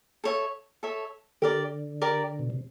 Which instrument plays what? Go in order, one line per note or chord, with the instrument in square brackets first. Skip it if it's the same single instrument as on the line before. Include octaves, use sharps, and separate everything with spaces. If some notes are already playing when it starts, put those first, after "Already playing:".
[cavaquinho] A4 C#5 E5
A4 C#5 E5
[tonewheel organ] D3 [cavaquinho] G4 A#4 D5
[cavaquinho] G4 A#4 D5
[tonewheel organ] B2
C3